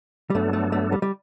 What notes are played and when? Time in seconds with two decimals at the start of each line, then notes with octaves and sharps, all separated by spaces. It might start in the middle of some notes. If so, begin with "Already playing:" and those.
0.30 G3
0.35 G2 F#3 A3 B3 D4 A4
0.53 A3
0.72 A3
0.92 G3
1.02 G3